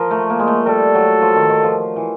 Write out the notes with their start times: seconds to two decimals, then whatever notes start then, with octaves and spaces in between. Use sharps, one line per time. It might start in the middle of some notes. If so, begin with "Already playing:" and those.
Already playing: F3 A#4
0.11 A3
0.30 A#3
0.39 G#3
0.47 A3
0.66 G3 A4
0.95 F#3
1.21 F3
1.36 D#3
1.49 D#3
1.64 F3
1.96 E3